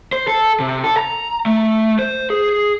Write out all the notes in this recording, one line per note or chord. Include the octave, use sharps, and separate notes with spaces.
C5
A4
C3
A4
A#5
A3
C5
G#4